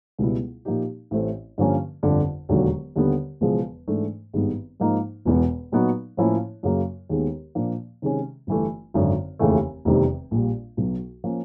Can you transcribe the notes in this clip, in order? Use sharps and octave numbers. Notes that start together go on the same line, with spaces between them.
C#2 B2 G3 B3 E4
A#2 F3 A#3 D#4 G4
A1 A2 E3 A3 C4
G2 D3 F3 A#3 C#4
G1 F2 D3
E1 D#2 D3 F#3
D#2 D3 G3 B3
E1 E2 C#3 F3 G#3
G#2 E3 A3 D4
G#1 G2 D#3 G#3 B3
G#2 F3 A#3 D#4
E1 E2 B2
A#2 F#3 B3 D#4 F#4
A2 F3 A#3 C#4 E4
F#2 C#3 F#3 A#3
D#2 D#3 G#3 B3
A#2 F3 A#3 D4
C3 D#3 G#3 C#4
G1 G2 E3 A3
G#1 F#2 D3
F1 D#2 C#3 E3 A3
F1 E2 C3 D#3 G3
A#1 A#2 G3
B1 B2 F#3
F3 A#3 C#4